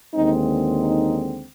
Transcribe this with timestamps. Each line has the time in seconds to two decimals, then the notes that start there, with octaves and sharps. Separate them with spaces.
0.14 D#2 D3 G#3 C4 D#4
0.80 D#4